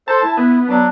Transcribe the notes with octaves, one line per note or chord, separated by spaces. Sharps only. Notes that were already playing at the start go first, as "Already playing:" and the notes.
A4 C5 A5
E4
B3
F#3 D4